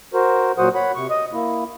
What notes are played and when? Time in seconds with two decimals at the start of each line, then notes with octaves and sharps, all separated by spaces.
0.14 F#4 A#4 C5
0.58 A#2 F#3 F#4 C5 F#5 D#6
0.75 C#5 F#5 B5
0.95 C3 C#6
1.10 D#5 D#6
1.33 A#3 E4